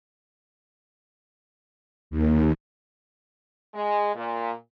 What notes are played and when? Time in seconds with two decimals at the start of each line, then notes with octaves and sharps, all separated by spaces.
2.11 D#2
3.75 G#3
4.15 A#2